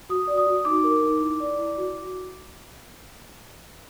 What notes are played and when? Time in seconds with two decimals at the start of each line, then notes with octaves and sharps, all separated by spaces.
0.09 F#4 D#6
0.28 D5
0.37 D#6
0.47 F#4
0.65 D#4 D6
0.84 A#4
1.03 D#4
1.21 E4
1.40 D5
1.59 E4
1.77 F#4